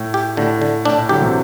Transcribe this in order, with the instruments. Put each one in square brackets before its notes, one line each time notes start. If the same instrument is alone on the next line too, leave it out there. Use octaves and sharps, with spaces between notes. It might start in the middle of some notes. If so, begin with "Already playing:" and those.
Already playing: [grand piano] A2
[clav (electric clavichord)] G4
[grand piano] A2 [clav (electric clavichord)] D3
[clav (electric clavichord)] D3
[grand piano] A2 [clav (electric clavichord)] D4
[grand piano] A2
[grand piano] D3 F#3 [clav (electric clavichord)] G4
[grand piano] C3 E3